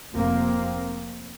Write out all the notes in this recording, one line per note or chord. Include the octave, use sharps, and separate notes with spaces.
F1 F2 C3 A#3 C4